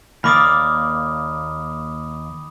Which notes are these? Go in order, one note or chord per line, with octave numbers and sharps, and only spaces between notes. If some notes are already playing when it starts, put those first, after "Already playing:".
D#2 A#3 D5 B5 D6 D#6 F6